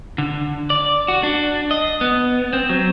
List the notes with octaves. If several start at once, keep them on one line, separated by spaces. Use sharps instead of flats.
D3
D5
F#4
D4
D#5
B3
C4
F#3